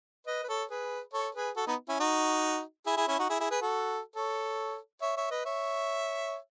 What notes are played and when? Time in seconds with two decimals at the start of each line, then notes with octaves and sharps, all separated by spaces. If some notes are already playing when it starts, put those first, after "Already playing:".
0.27 B4 D#5
0.43 B4
0.49 A4 C#5
0.70 G#4 B4
1.13 A4 C#5
1.35 G#4 B4
1.56 F#4 A4
1.67 B3 D#4
1.89 C#4 E4
2.00 D#4 F#4
2.86 E4 G#4
2.97 E4 G#4
3.08 C#4 E4
3.19 D#4 F#4
3.29 E4 G#4
3.40 E4 G#4
3.51 G#4 B4
3.61 F#4 A4
4.16 A4 C#5
5.02 C#5 E5
5.17 C#5 E5
5.31 B4 D#5
5.45 C#5 E5